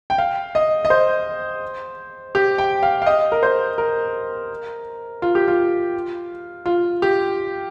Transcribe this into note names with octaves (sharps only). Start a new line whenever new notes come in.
G5
F5
D#5
D#5
C5
G4
G5
F5
F5
D#5
A#4
C5
A#4
F4
G4
F4
F4
G4